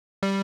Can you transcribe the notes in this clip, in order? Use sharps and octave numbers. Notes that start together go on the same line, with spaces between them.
G3